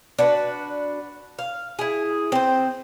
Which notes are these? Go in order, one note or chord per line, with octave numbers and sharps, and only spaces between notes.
D4 F#4 B4
F5
E4 G#4
C4 C5